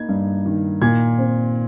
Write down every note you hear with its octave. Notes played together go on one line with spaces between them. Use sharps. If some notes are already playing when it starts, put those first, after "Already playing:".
Already playing: A#3 D#4 G#6
G2
D#3
A#2 G#6
C4